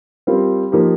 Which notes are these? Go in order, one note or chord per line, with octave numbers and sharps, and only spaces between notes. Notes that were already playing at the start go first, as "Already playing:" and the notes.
G3 C4 F4 A#4
F3 A#3 D#4 G4